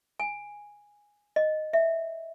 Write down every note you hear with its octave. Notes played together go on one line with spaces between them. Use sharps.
G#5
D#5
E5